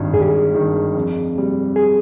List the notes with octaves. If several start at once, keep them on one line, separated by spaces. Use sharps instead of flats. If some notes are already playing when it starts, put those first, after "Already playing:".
Already playing: G#1 G2 D#3
G#1 G#4
G4
G#4
G2 D#3
F2
C3 G3
G#4